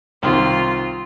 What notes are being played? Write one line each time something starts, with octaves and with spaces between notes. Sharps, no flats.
C2 D#3 F4